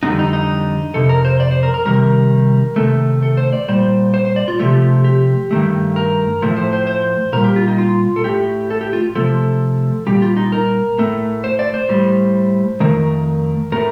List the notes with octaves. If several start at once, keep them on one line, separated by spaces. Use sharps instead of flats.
F2 D3 G3 D#4
D#4
D#4
F2 C3 A4
A#4
C5
D5
C5
A#4
A#4
C3 D#3 G3 A#4
C3 D#3 A3 A4
A4
C5
D5
A#2 G3 C5
C5
C5
D5
F4
C3 F3 A3 G4
G4
G2 D#3 A3
A#4
A2 F3 A3
C5
C5
C5
A#2 G3 A#4
G4
F4
D#4
F4
A4
A2 A3 G4
A4
G4
F4
C3 F3 A3 A4
A#2 G3 G4
F4
D#4
A#4
A2 A3
C5
D5
C5
A2 G3
F2 D#3 A3 A#4
A2 A3 A#4